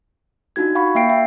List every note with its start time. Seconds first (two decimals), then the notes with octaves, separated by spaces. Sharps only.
0.56 D4 D#4 F4 F#4 G#6
0.75 F5 F#5 B5 C#6
0.95 A#3 E5 F5 G5 C7 D7
1.09 E5 G5